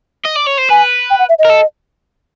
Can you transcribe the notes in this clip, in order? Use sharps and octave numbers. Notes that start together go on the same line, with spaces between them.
D#5
D5
C#5
C5
B4 G#5
G5
F#5
E5
D#5
A#4
A4